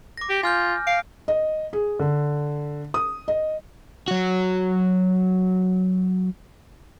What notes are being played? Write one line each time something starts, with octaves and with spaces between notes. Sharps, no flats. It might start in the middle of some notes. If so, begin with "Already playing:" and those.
D6 A#6
G4
F4 G#5 F6 G6
F5 D7
D#5
G#4
D3
D#6
D#5
F#3 F#4